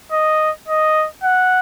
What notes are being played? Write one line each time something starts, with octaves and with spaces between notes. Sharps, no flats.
D#5
D#5
F#5